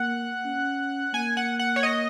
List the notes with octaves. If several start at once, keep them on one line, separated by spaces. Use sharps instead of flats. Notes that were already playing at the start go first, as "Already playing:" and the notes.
Already playing: A#3 F#5
C#4
A#3 G#5
F#5
F#5
C#5
D#5